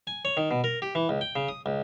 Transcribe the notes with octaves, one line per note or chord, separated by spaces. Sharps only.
G#5
C#5
D#3
B2
A#4
G4
E3
C#2
G5
C#3
D#6
C#2